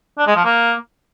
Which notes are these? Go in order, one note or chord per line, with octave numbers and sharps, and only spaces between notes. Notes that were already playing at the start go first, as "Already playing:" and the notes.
D4
G#3
F3
A#3